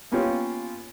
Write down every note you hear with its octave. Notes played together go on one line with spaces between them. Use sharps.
A#3 B3 C#4 F4 G4